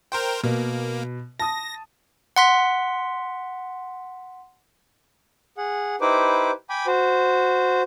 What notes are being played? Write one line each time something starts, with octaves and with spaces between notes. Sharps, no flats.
A#4 C5 G5 C6
B2 A#3
A5 D#6 A#6
F#5 C6 B6
G#4 F#5
D#4 E4 G4 B4 C5 D6
G5 G#5 B5 D6
F#4 C5